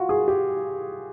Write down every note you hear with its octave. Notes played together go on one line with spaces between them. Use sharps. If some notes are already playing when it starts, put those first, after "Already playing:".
Already playing: F4 F#4
G#4
G4